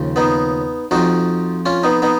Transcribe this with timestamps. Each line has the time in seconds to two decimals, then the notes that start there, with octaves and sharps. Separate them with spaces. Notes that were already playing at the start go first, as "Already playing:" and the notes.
Already playing: D#2 C#3 F3
0.16 B3 D#4
0.91 F2 F3 D#4 F#4
1.66 C#4 F4
1.83 B3 D#4
2.02 B3 D#4